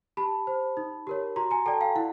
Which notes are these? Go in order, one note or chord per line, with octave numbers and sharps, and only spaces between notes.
G4 A5 B5
C5
D#4
G4 A#4 C#5
F#4 A#5 C6
G#5 A#5
A4 D5 G5 A5
F5 G5
E4 F#5